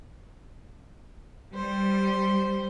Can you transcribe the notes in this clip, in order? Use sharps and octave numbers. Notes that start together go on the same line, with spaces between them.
G3 C5